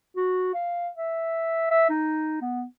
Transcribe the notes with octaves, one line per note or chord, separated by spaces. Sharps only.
F#4
F5
E5
E5
D#4
B3